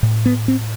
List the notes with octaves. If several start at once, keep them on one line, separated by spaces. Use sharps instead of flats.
A2
B3
C4